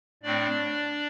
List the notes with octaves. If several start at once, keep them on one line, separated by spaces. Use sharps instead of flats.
A2 A3 C4 D4 D5